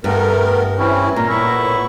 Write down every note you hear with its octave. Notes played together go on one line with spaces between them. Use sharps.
G2 A3 B3 A#4
E3 C4 C#4 E4
A#2 A#5
A2 B3 E4 C#6